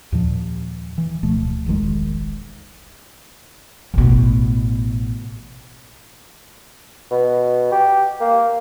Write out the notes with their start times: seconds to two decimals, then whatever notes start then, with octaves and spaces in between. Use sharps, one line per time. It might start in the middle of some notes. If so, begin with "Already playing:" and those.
0.12 D#2 A#2 F3
0.98 E3
1.23 D1 B2 F3 A3
1.66 E1 A#1 D#3 G#3
3.94 A1 B2
7.11 B2
7.72 G4
8.21 A#3